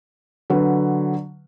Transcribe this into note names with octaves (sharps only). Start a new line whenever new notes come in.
D3 F#3 B4